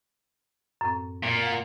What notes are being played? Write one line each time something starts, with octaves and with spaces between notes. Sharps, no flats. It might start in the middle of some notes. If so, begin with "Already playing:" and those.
F#2 A2 C4
A#2
F5 F#5